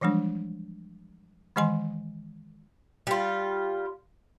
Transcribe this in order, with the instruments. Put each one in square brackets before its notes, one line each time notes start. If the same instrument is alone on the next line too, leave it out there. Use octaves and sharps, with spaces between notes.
[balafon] E3 F3 G3 G#3 D4
D#3 E3 G#3 D#5 G#5 C6
[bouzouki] G3 F4